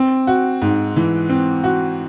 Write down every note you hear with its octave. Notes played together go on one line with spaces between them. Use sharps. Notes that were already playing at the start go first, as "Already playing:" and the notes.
Already playing: C4
F#4
G#2
E3
C4
F#4